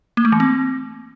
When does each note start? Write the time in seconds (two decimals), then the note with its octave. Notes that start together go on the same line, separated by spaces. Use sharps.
0.17 A#3
0.25 A3
0.32 E3
0.40 C4